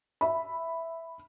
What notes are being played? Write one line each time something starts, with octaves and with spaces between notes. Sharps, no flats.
E5 B5